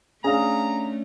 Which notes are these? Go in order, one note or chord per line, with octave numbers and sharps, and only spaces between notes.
A3 C#4 D4 G#4 F5 A#5